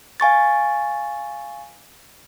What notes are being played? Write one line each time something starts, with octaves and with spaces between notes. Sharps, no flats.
F5 G#5 C#6 A6